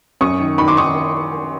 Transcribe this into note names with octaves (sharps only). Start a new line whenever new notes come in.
F#2 C#6 D#6
D#3
D#3 B5 C#6
C6 D6
D#3 C#6 D#6